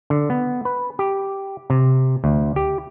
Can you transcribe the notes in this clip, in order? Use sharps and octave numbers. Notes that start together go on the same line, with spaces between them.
D3
B3
B4
G4
C3
D2
G4